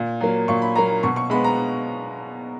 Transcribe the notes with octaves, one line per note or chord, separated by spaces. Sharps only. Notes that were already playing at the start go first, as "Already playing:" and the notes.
Already playing: A#2
F#3 A#3
A#2 C#6
B5
F#3 A#3 A#5
B2 C#6
C#6
G#3 B3 B5
A#5